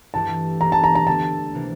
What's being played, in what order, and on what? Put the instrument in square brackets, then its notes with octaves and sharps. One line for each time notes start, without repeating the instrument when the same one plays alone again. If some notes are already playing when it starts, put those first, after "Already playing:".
[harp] G2 E3 A3 E4 G4 [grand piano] A5
[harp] G2 E3 A#3 D4 A4 [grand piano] A#5
[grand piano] A5
A#5
A#5
[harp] D3 A3 D4 A4 [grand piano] A5
[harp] C3 E3 A#3